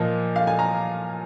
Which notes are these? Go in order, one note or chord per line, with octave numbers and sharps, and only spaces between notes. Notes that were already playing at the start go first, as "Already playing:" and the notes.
Already playing: A#2 F3 A#3 D#5
F5
G#5
A#5